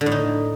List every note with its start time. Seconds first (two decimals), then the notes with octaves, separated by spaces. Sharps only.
0.01 D3
0.06 A2
0.12 D#4